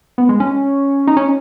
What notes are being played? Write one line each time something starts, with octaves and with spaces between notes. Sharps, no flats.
B3
G#3
C#4
D#4
C#4